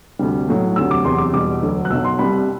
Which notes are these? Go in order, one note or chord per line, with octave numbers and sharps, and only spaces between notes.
D2 C3 G3
B1 A2 F#3
D2 C3 F#3 E6
D6
E2 C3 F#3 C6
D6
E2 B2 G3 D6
E1 D2 D3 F#3
F#6
B1 B2 F#3 E6
C6
C2 C3 G3 B5